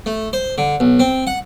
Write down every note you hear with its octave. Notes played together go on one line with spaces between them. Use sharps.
A3
C5
D3
B1
C4
F#5